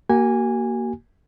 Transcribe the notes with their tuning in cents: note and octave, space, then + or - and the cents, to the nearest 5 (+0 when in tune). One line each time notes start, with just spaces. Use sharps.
A#3 +0 F#4 +40 G#5 -15